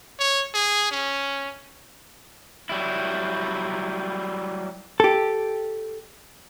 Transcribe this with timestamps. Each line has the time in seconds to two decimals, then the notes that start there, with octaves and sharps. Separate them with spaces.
0.19 C#5
0.54 G#4
0.91 C#4
2.69 F#3 G3 E4
5.00 G4 A4